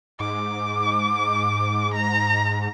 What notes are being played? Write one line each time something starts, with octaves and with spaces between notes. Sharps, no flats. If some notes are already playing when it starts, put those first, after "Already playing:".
G#2 D6
A#5